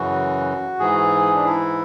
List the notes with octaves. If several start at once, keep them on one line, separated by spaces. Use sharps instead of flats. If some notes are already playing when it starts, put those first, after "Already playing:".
Already playing: F#2 C#3 E3 F#4
G#2 E3 G#4
D4
E4